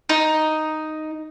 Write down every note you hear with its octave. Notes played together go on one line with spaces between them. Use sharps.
D#4